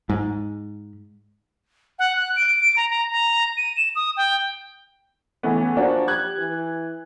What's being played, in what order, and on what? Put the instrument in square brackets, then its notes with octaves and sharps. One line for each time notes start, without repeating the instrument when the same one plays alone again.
[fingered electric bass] G#2
[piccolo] F#5
F#6
D7
D7
A#5
A#5
A#5
D#7
E7
D#6
G5
[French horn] C#3 [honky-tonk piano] E3 A3 B3
[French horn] F3 [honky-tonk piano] A#3 D4 F#4
[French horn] G4 [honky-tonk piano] F#6 G#6
[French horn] E3